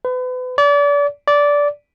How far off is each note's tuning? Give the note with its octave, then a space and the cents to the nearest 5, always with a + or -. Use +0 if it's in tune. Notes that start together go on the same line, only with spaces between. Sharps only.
B4 +35
D5 -35
D5 -15